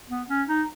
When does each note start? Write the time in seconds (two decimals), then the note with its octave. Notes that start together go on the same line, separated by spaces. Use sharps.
0.10 B3
0.29 C#4
0.48 D#4